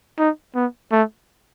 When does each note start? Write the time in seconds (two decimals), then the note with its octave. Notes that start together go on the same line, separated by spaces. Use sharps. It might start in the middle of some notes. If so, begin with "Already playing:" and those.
0.18 D#4
0.55 B3
0.91 A3